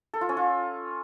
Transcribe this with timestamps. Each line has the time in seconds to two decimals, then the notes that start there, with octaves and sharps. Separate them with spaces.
0.14 A4
0.21 F4
0.29 C#4
0.37 F4